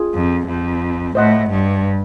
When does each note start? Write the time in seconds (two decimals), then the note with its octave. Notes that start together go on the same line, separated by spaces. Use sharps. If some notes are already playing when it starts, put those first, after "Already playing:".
Already playing: F4 G#4 G#5
0.14 F2
0.47 F2
1.15 A2 C5 D#5 F#5
1.50 G2